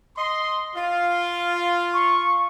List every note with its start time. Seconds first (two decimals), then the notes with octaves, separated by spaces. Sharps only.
0.17 D#5 C6
0.76 F4
1.94 C#6